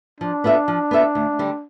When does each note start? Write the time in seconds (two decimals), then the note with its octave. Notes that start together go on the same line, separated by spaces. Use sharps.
0.20 F3 D4
0.44 B3 F4 A4 E5
0.68 F3
0.91 B3 F4 A4 E5
1.15 D2
1.39 D3 G3